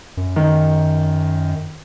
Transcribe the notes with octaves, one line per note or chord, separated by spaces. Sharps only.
F#2
D#3